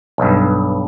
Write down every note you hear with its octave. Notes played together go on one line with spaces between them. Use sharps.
B1 G2